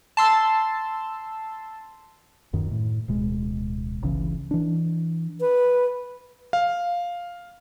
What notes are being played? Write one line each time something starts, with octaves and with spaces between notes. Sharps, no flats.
A5 C6 E6
D1 F#2 D#3
A2
D1 B2 G#3
G1 C#2 C#3 E3
E3 D4
B4
F5